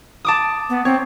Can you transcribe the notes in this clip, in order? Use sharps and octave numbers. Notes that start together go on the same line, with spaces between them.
A5 D6 D#6
B3
C4 C#5